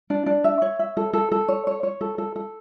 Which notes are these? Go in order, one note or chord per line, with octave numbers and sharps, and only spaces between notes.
D4
D4
E5
C#5
E5
A4
A4
A4
C#5
C#5
C#5
A4
A4
A4